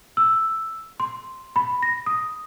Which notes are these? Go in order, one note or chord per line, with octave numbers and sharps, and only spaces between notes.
E6
C6
B5
A#6
D#6